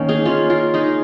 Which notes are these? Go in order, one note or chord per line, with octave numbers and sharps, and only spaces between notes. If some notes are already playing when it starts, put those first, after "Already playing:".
Already playing: D#3 A#3 C#4
D#4 G#4
C#4 F4
F4 A#4
D#4 G#4